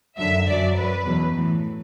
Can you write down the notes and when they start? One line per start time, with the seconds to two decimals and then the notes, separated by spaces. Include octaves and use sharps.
0.17 F#2 D3 F#3 E5
0.46 F#2 F#3 D5
0.76 F#2 F#3 B4
1.05 E2 B2 F#3
1.35 A2 E3